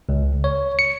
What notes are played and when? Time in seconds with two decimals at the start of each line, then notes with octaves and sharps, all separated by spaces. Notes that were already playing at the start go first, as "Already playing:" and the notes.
0.09 C#2
0.44 C#5
0.79 C#7